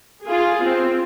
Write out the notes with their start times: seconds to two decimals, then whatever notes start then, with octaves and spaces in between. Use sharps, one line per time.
0.25 F4 G#4
0.65 C4